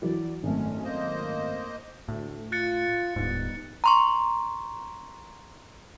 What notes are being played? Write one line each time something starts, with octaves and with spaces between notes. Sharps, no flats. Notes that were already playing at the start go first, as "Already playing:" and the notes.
E3 F#3 D5
G#1 F#2 G#3 A3 C#4
A#3 C5 D#5
D2 A2
F4 F#6 A6 C#7
D1 G#2 G3 B3 D#4
A#5 C6 C#6